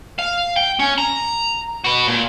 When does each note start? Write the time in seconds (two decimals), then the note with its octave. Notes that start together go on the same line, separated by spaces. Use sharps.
0.19 F5
0.56 G5
0.79 C#4
0.98 A#5
1.84 F#4 B4
2.08 A#2